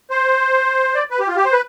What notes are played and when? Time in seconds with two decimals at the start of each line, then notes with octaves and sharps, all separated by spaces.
0.10 C5
0.95 D5
1.11 B4
1.19 G4
1.28 F4
1.36 G4
1.45 C5
1.53 B4